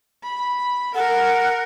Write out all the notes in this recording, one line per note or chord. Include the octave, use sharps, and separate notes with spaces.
B5
A#4 F#5